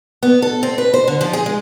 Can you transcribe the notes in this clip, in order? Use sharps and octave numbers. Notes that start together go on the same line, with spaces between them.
B3
A4
C4
B4
C5
D3
F3
G#4
G#3